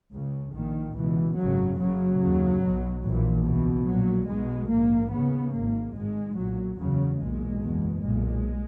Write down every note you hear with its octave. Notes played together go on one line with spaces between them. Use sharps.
C#2 C#3
A#1 A#2 D#3
C#2 B2 E3
G#1 F#2 C#3 F#3
F#1 F#2 C#3 F#3
D#2 C#3
B1 B2
A#1 A#2 E3
C#2 B2 E3
A#1 A#2 F#3
B1 B2 G#3
A#1 G#2 A#3
D#2 C#3 B3
G#1 G#2 A#3
G#1 G#2 G#3
B1 A#2 F#3
F#1 E2 C#3 F#3
B1 A#2 G#3
F#1 E2 B2
B1 A#2 G#3